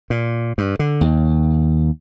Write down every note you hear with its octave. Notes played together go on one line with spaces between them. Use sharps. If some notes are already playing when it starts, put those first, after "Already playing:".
A#2
G2
D3
D#2